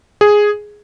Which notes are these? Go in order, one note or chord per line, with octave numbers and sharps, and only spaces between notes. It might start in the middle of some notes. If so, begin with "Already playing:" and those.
G#4